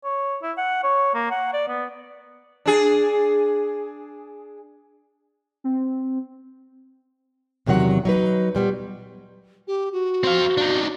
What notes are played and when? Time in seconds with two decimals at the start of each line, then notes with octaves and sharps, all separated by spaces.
0.04 C#5
0.43 E4
0.57 F#5
0.84 C#5
1.15 A#3
1.31 F#5
1.53 D5
1.68 B3
2.66 D4 G#4
5.64 C4
7.66 E2 C3 D#3 F#3 F#5
8.05 F#3 D#4 B4
8.55 A#2 G3 B3
9.67 G4
9.92 F#4
10.24 C4 F5
10.57 D4 D#4